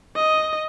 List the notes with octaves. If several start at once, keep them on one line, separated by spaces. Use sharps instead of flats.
D#5